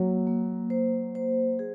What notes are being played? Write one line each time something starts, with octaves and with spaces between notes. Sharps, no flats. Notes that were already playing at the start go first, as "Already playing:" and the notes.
Already playing: F#3 A#3
A#3
C5
C5
G#4